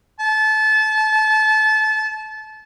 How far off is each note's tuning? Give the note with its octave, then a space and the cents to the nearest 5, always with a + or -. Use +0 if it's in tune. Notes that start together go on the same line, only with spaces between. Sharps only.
A5 -25